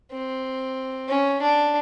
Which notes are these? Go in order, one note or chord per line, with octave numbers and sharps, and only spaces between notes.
C4
C#4
D4